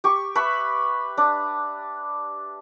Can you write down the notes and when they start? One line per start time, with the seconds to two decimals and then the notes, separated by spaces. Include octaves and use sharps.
0.04 G4 C#6
0.35 B4 E5 B5 C#6
1.18 D4